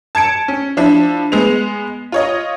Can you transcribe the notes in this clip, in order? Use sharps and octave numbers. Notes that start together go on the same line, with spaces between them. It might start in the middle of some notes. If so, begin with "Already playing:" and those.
A5 G#6 C#7 D7
C#4
F3 D4 E4
G#3 B3 F7
F4 C#5 D#5